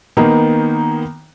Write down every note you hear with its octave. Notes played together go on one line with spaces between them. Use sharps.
D#3 A#3 B3 D#4